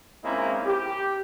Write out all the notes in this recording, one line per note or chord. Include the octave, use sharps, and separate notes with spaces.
G#3 A#3 C4 C#4 D#4 E4
G4